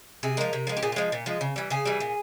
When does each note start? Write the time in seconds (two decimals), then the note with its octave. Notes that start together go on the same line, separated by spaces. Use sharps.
0.23 C3 G#4
0.37 F3 G#3 A#4
0.53 C3
0.67 F3 G#3
0.77 G4
0.83 A#2 G#4
0.92 F4
0.96 F3 G#3
1.12 A#2
1.26 F3 G#3
1.41 C#3
1.56 E3 G3
1.70 C#3 G#4
1.85 E3 G3
2.00 A#2